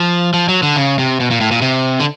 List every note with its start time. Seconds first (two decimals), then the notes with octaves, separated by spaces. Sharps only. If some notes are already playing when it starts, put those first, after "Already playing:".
Already playing: F3
0.34 F3
0.49 F#3
0.63 D3
0.76 C#3
0.99 C3
1.20 B2
1.31 A#2
1.41 A2
1.51 A#2
1.62 C3
2.00 D3